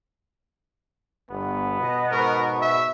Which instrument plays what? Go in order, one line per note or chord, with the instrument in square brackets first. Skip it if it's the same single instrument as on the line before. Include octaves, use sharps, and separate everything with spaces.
[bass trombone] G1 [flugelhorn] B3
[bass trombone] B2 [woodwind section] D#5
[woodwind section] G#2 C#6 [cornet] A#4
[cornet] E5